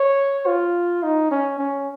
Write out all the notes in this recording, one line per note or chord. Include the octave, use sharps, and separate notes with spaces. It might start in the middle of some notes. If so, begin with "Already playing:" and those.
Already playing: C#5
F4
D#4
C#4
C#4